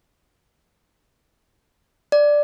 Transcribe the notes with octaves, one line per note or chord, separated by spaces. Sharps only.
D5